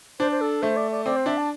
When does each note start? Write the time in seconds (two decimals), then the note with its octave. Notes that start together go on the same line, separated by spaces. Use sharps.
0.19 D4 C5
0.31 C5
0.41 A4
0.62 A3 C5
0.76 D5
0.91 D5
1.05 C4 D5
1.16 C5
1.26 D4 E5
1.38 A5